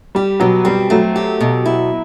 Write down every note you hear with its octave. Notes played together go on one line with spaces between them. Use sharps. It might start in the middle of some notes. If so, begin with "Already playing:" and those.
G3 G4
B2 F#3
G3 C4
F#3 A3
G4
B2
E4